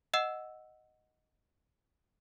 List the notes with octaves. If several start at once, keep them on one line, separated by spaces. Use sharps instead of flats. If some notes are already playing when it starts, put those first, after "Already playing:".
D#5 F#5 E6 E7